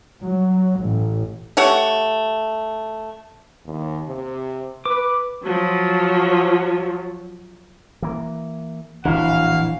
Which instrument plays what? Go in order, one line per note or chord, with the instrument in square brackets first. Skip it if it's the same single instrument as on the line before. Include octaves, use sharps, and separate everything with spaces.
[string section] F#3
A1
[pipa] A3 G4 C#5 F#5
[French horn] D#2
C3
[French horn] B4 [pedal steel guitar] D6
[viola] F3 F#3
[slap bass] E3 A#3
[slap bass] D1 A#1 D4 [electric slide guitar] E3 [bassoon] F#4 [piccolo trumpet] F5